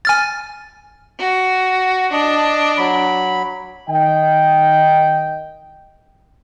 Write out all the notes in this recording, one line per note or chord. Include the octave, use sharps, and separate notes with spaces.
G#5 F6 A6
F#4
D4 D#5 A5
F#3 B5
D#3 D#5 G5